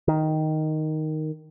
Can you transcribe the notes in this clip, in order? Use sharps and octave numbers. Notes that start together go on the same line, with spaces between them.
D#3